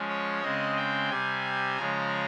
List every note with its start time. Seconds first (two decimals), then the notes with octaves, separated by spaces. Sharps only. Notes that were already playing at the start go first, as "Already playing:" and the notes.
Already playing: F3 G#3 C#4
0.09 C#5
0.42 C#3 G#3 C4 D#5
0.77 G5
1.10 C3 G3 C4 G#5
1.78 C#3 F3 G#3 C#4 A#5